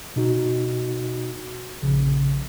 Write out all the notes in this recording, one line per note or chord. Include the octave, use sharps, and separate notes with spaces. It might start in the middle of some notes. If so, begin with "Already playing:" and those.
B2 D#4 F#4
A#1 C#3